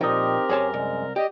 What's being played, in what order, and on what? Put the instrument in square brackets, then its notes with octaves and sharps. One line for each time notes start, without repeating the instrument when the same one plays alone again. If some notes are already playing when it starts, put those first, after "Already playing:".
[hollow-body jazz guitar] A#2 F3 [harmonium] C4 G4 [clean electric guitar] D#4 D#5 [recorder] A#4
[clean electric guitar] F#2 G#5 [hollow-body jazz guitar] G#4 C#5 A5
[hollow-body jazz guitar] C2 [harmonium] G#3
[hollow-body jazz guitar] G4 [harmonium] D5 [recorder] D#5